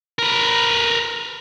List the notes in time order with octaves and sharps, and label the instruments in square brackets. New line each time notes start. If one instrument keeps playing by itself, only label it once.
[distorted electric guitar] A#4 B4